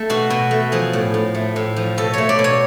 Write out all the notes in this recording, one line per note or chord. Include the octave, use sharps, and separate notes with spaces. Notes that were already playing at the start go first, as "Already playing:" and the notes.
Already playing: A3
B2 F#4
B2
A3
F3 G#4
A2
A2
A3
A2
F3
B2 A4
A3 C#5
D5
B2
C#5